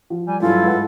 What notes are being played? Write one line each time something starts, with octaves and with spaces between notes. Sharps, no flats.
F3
G3 G#5
G2 F#3 E4 F4 A4
G#2 B4 F#5